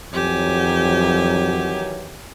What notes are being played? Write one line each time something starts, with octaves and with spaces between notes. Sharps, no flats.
F2 D#3 E3 F#3 G4 G#5